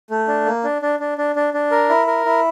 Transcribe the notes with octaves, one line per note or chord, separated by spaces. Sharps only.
A3
D4
A#3
D4
D4
D4
D4
D4
D4
A#4
E4
A#4
E4